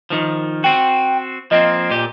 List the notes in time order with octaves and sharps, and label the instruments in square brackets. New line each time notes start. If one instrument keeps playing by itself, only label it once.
[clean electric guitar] D#3 F3
[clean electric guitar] C4 F#4 [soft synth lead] G5
[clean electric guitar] F3 A#3 C4 [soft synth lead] D#5
[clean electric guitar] A#2 G4